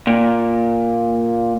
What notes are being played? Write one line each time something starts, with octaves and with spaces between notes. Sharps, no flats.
A#2